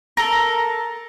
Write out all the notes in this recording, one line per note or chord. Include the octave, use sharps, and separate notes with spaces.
A4 A#4